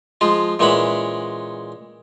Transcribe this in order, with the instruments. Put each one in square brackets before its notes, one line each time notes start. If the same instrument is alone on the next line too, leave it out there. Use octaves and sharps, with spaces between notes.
[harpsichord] F3 G#3 F4
A#2 E3 G#3 C#4 F#5 B5